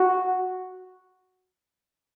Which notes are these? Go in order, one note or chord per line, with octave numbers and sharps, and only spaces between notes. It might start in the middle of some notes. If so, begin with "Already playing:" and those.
Already playing: F#4